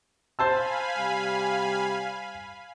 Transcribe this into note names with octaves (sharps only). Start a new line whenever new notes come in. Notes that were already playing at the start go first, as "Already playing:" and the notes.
C5 F5 G#5 A5 B5 E6
C3 G3